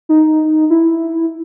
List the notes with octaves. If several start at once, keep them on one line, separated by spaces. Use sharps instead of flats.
D#4
E4